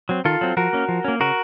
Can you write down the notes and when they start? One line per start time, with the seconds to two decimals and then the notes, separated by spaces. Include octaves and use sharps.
0.09 F#3 C4
0.25 D#3 F4 A4
0.41 F#3 C4
0.57 F3 F#4 A#4
0.73 A#3 C#4
0.89 F3
1.04 A#3 C#4
1.20 C#3 F#4 A#4